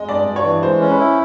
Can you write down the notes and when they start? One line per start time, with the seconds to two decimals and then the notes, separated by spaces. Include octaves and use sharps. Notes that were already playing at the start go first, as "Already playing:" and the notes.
Already playing: G#3 D#5
0.08 G2 D5
0.26 G2
0.36 C#5
0.44 E3
0.63 G#3 C5
0.81 C#4
0.90 B4
0.99 E4